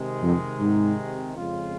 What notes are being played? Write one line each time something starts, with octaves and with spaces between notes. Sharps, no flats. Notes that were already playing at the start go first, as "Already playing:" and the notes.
Already playing: C3 D#3 G#3
F2
G#2
F2 C#3 G#3 C#4 F4